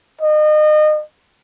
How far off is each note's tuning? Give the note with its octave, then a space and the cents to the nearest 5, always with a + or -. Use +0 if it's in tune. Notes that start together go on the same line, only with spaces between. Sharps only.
D#5 -30